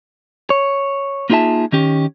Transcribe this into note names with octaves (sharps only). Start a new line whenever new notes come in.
C#5
A#3 D#4 F4 G#4 E5 A5
D#3 C#4 G4